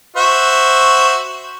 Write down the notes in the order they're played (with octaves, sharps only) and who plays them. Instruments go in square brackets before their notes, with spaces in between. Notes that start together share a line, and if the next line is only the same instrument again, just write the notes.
[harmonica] F#4 C5 E5